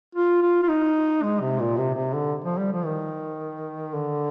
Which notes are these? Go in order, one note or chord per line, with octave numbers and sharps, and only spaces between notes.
F4
F4
F4
D#4
G#3
C3
A#2
C3
C3
D3
F3
G3
F3
D#3
D3